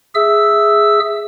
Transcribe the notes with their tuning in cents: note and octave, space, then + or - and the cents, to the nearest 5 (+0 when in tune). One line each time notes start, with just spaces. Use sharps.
G#4 +0 E5 +0 E6 +0